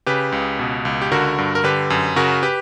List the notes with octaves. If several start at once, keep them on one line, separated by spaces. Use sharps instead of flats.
C#3 G4 B4
C#2
B2
C#2
G4
D3 F#4 A#4
G2
A#4
D3 G4 B4
F#2
C#3 F#4 A#4
G4 B4